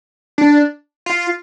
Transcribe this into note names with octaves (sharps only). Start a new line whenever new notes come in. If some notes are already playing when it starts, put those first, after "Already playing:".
D4
F4